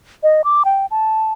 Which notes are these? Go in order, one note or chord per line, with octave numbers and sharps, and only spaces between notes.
D#5
D6
G5
A5